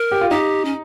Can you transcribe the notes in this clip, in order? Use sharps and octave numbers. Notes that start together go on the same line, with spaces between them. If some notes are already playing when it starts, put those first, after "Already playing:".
Already playing: A#4
G4
F4
D#4 G4
C#4